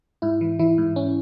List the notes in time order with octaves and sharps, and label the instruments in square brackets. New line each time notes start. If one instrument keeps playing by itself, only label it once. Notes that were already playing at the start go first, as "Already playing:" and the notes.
[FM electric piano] G#2 E4
E3
E3 E4
G#2
C#4